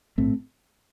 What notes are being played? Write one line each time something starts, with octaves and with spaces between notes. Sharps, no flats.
A#1 A2 A3 C4